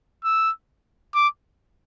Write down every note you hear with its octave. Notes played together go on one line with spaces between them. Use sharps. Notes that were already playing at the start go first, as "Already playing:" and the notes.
E6
D6